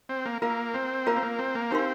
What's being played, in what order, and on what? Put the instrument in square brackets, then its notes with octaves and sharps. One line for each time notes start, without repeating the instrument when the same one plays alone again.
[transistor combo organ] C4
A#3
[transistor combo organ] A#3 [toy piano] F4 A#4 F5 A#5
[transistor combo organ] C4
[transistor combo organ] A#3 [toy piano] F4 A#4 F5 A#5
[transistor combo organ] C4
A#3
C4
A#3
[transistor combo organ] C4 [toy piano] D#4 G4 A#4 F5 C6